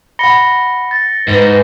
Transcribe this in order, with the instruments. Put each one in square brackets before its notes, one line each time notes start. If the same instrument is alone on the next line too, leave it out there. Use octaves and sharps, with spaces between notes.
[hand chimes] F#5 B5 [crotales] A#6 C#7 G7
[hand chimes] A6
[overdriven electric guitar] G#2 [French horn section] B4